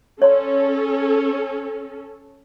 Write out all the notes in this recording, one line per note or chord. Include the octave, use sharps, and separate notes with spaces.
C#4 A4 C#5 D5 C6